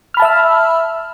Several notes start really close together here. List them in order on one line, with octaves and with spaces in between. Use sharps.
F6 B5 A5 E5 E6